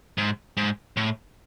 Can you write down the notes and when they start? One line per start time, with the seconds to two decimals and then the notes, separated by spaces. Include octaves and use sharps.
0.18 G#2
0.57 G#2
0.97 A2